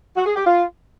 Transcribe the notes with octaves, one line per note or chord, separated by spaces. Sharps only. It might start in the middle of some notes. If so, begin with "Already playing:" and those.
F#4
G#4
G4
F4